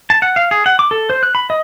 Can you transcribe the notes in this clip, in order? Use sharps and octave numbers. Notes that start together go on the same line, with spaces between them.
A5
F#5
F5
G#4
F#5
D6
A4
C5
F#6
B5
D#5